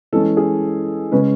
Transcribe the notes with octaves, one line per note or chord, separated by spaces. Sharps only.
E3 G#3 C#4 A4
G#4
C#3 G#3 C#4 B4